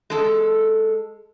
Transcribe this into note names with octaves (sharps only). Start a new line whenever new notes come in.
G#3 A4